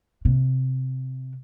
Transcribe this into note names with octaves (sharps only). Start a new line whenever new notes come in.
C3